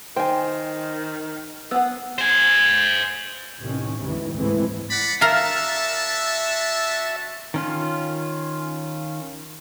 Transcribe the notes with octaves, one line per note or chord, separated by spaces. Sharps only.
D#3 C5 G5 G#5
B3 B4 F#5 E6
C5 G#5
A1 C3 D#3 C#4
D2 G#2 C3 E3
F#1 G#2 E3 G#3 A3 C4
D5 F#5 B5
D4 F#4 A#4 E5 F5 A5
D#3 C#4 F4